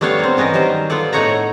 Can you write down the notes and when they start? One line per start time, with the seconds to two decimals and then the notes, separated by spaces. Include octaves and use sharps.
0.01 G3 A3 B3 D4 C#5 F5
0.19 A#3 C4
0.37 E3 B3 C#4 A#4 D#5
0.54 D#3 F#3 G3 C5
0.90 B3 F4 A4 D5
1.13 A2 A3 D#4 C#5 F#5 A#5